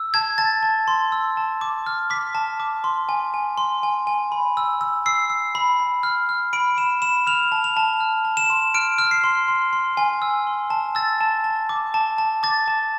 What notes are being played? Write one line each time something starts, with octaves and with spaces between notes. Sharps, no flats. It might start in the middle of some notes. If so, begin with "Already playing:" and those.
Already playing: E6
A5 G#6
A5 A6
A5
C6
E6
A5
D6
F6
D6 B6
A5
D6
C6
G#5
G#5
C6
G#5
G#5
B5
E6
E6
E6 C7
E6
B5
B5
F6
F6
B5 D7
B5 E7
B5 E7
F6 F7
A5
F7
A5
F6
A5
E7
C6
F6 D7
F6
C7
C6
C6
C6
G#5
E6
C6
A5
E6 A6
A5
A5
D6
A5
A5
D6 A6
A5